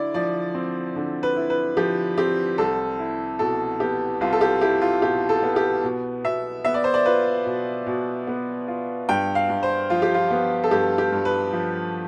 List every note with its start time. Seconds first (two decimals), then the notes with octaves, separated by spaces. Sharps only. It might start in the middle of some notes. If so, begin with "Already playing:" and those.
Already playing: D3 E4 D5
0.14 F3 D5
0.54 C4
0.96 D3
1.23 B4
1.36 E4
1.50 B4
1.77 F3 G4
2.17 C4 G4
2.58 C2 A4
2.99 E4
3.39 B2 A4
3.80 B3 G4
4.21 C2 F4
4.33 A4
4.41 G4
4.61 E4 G4
4.82 F4
5.02 B2 G4
5.29 A4
5.42 B3
5.56 G4
5.83 B2
6.24 B2 E5
6.65 B3 E5
6.74 D5
6.84 C5
6.94 D5
7.06 F4 B4
7.46 B2
7.87 B2
8.27 B3
8.68 F4
9.09 G2 G5
9.35 F5
9.49 G2
9.63 C5
9.90 F3 F4
10.02 G4
10.14 F4
10.31 B3
10.64 A4
10.71 G2 G4
10.98 G4
11.12 G2
11.25 B4
11.53 F3